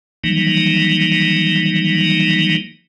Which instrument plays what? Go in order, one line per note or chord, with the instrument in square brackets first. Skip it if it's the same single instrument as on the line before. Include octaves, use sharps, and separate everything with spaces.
[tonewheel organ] D#3 E3 F#3 G3 A#3 D#4